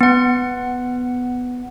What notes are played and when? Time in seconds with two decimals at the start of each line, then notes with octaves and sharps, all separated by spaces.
0.01 B3 F#5